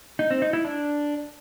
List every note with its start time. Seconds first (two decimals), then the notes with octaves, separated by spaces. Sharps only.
0.19 D#4
0.31 C4
0.42 D#4
0.53 E4
0.65 D4